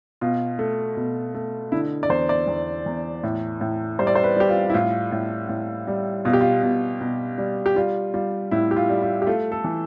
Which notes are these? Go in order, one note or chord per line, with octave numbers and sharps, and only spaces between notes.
B2 F4
A3
B2
A3
D3 E4
D5
E2 C5
D5
E2
E2
A2
A2
G3 C5
D5
C5
B4
G3 G4
F4
E4
A2 F4
A2
A2
G3
B2 F4
G4
F4
B2
B2
G3
G4
G3 F4
G3 F4
A2 E4
G4
F4
G3
F4
G4
A3 F4
A4
E3